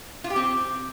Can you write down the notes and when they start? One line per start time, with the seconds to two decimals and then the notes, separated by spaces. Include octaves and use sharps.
0.24 F4
0.30 G4
0.36 C4